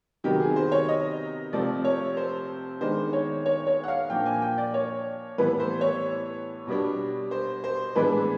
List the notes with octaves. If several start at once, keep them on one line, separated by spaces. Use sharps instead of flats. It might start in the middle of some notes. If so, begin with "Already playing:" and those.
C3 D#3 F#3 B3 G4
G#4
C5
C#5
D#5
C3 F3 A3 C4 D5
C#5
C5
D#3 G#3 B3 D4 C5
C#5
C#5
C#5
F#5
F5
A#2 F3 A#3 D4 G5
G#5
G5
D5
C#5
A2 E3 G3 B3 B4
C5
C#5
B2 G3 B3 D4
C5
C5
A2 E3 G#3 B3 D4 B4